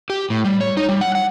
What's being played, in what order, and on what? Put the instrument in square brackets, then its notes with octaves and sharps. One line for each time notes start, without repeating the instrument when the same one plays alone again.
[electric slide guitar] G4
A2
G3
C#5
D#4
G3
F#5
F#5